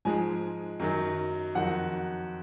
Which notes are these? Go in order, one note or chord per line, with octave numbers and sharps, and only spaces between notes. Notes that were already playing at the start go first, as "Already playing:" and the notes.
G#2 F3 G#3 G#5
F#2 D#3 F#3
F2 D#3 F#3 F#5